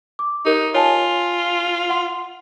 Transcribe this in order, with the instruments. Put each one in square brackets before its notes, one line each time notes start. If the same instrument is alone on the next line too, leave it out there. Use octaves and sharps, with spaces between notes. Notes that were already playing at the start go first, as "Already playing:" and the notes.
[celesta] D6
[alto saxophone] D#4 [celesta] G4 A#4
[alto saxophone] F4 [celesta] C#5 G#5 A5
[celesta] F#5 C6